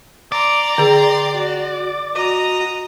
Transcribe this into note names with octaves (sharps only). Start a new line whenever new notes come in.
D5 A#5 C6
D3 G#4 G5
F#4
F#4 D#5 A#5